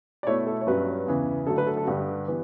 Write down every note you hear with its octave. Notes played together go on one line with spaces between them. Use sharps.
D5
B2 A3 E4 C#5
A4
C#5
G2 F#3 C#4 B4
E2 C#3 E3
D3 F#3 A3 A4
B4
A4
A4
F#4
G2 D3 G3 G4
E3 B3